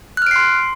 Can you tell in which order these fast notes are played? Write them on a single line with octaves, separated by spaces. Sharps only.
F#6 F6 D7 C7 C6